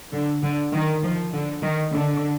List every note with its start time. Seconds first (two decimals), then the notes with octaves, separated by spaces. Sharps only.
0.13 D3
0.43 D3
0.73 D#3
1.03 F3
1.33 D3
1.62 D#3
1.92 D3